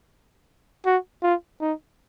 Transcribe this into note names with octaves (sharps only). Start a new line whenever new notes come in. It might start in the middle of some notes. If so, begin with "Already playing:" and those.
F#4
F4
D#4